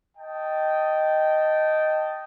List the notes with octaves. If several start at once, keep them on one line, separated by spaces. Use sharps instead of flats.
D#5 G5 A5